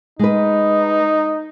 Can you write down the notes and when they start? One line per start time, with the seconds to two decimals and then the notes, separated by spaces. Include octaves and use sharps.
0.19 G#3 D#4 B4